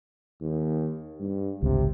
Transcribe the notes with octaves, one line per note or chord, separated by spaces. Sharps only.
D#2
G2
G#1 C#2 C3